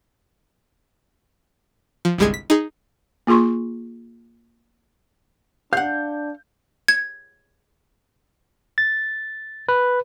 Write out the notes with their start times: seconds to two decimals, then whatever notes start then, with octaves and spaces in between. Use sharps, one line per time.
2.05 F3
2.18 G1 C2 G3 G#3 G#4 G#5
2.34 B6
2.50 D#4 G#4
3.27 A#3 F4 G#4 C6 C#6
5.73 D4 F5 F#5 G6
6.88 G#6
8.78 A6
9.69 B4